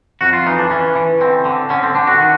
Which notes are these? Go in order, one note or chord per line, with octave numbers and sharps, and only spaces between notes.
F2 F#4
F4
E3 D#4
D4
E3 C#4
E3
D3 C4
D3
D3 C#4
C4
D3 D4
F#4
D#3